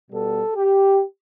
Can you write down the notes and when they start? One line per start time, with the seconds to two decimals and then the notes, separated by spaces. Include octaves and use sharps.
0.11 B2 G3 B3 A4
0.56 G4